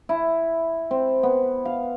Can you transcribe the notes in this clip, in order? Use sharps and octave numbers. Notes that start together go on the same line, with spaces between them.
E4
C4
B3
F5